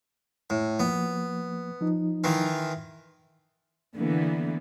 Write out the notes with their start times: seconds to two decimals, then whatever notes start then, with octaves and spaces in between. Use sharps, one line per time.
0.50 A2
0.80 F3 A#3 B3
1.81 F3 D#4
2.24 D#3 E3 F4
3.98 D3 E3 A#3 B3